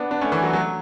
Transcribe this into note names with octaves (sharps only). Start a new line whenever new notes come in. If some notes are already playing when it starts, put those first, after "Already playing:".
Already playing: B3 D4
B3 D4
A3 C#4
E3
F#3
F#3 A3